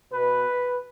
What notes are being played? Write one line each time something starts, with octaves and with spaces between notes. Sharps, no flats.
B2 B3 B4